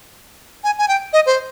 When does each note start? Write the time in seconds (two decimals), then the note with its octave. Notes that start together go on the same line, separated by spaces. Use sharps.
0.64 G#5
0.79 G#5
0.88 G5
1.13 D#5
1.26 C5